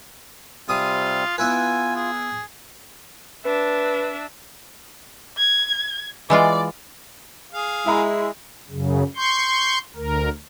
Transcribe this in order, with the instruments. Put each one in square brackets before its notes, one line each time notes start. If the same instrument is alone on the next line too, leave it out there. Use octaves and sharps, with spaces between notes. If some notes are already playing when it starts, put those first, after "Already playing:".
[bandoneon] C3 G3 C4 [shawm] F4 [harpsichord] G#4 D#6
[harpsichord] B3 E4 B4 [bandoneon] F4 [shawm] G#5
[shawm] G#4
[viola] D4 E5 [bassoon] B4
[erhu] G#6
[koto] E3 G#3 F4 [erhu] D5
[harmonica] G#4 F5
[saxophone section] G#3 E4 [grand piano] E5 A#5 B5
[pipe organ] F#2 C#3
C6 C#6 G6
D2 A#4